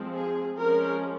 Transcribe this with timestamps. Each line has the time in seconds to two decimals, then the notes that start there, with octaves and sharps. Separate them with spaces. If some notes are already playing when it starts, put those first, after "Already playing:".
Already playing: F3 G#3 C4
0.14 G#4
0.58 F3 G#3 C#4 A#4